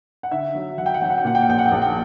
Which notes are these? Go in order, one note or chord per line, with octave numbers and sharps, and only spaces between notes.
F#5
D3 E5
F#3
F#3 F#5
G5
F#5
F#3 G5
F#5
G5
A#2 F#5
G5
F#5
A#1 G5
F#5
G5
A#1 F#5
G5